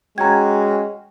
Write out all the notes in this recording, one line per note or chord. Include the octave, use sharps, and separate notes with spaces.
G#3 C#4 F#4 G5 A#5 G#6